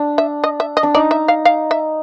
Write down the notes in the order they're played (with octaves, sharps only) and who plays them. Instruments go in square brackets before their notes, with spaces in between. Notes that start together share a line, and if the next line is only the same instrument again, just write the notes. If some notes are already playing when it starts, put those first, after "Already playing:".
Already playing: [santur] D4
[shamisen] E5
D#5
E5
D#5
[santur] D4
[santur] D#4 [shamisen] D5
[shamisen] E5
F5
F5
E5